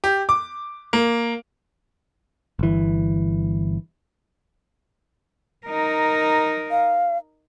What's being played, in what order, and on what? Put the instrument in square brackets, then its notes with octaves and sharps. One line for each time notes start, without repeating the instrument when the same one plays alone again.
[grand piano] G4
D6
A#3
[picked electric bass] G1 E3
[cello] D#4 A#4
[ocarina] F5